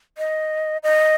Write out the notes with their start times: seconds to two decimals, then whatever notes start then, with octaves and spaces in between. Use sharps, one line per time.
0.18 D#5
0.83 D#5